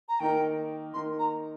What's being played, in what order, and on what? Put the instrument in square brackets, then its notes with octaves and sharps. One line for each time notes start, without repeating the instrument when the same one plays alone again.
[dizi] A#5
[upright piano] D#3 A#3 D#4 A#4 [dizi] G5
[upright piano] D#3 A#3 D#4 A#4 [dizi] C6
[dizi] A#5